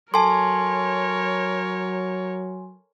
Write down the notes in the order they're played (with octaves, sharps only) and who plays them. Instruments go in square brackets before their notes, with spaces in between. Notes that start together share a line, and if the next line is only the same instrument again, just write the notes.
[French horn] F#3 [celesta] A4 A5 [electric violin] A#4 C#5 [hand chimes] G#5 C6